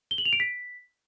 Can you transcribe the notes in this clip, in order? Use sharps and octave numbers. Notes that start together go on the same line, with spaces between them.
G7
F#7
F7
D7
B6